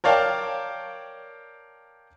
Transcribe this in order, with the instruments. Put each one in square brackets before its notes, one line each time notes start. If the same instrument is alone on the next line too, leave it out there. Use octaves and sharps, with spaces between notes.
[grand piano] A#4 C#5 D5 F5 G5 A5